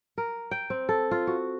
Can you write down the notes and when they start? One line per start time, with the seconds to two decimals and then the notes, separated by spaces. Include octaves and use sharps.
0.18 A#4
0.51 G5
0.70 C4
0.89 A4
1.11 F4
1.27 F#4